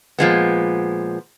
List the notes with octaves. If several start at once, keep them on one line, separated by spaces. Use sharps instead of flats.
A#2 F3 G#3 B3